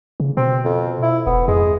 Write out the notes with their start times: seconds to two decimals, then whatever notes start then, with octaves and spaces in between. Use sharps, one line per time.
0.20 C#3
0.37 B2 C4
0.65 F2
1.03 E4
1.27 E1 B3
1.48 F2 G#3